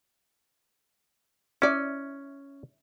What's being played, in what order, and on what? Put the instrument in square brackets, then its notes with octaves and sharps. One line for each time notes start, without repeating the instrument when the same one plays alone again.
[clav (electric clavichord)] C#4 [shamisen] E4 D5